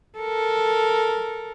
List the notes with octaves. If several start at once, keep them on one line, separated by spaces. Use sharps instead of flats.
A4 A#4